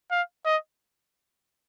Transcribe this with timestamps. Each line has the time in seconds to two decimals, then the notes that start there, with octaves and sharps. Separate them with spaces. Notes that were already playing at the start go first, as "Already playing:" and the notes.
0.11 F5
0.46 D#5